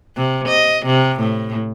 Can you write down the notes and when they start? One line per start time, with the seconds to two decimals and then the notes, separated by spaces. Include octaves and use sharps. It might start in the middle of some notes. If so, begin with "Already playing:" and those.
0.16 C3
0.49 D#5
0.86 C3
1.21 A2